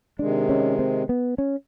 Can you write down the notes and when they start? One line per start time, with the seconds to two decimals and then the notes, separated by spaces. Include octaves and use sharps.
0.19 C3 D#3 G#3 D4
0.49 C#4
0.79 C4
1.09 B3
1.38 C#4